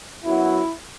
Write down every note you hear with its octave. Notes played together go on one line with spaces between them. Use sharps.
F#2 F#3 B3 E4